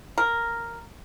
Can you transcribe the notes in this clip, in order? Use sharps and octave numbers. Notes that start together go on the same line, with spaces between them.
A#4